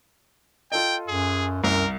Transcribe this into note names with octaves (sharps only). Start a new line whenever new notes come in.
F4 A4 D#5 G5
F#2 G#4
C2 F#2 A#4